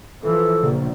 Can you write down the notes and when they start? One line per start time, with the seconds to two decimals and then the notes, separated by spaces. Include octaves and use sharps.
0.23 E3 F3 A4
0.63 A#1 C#3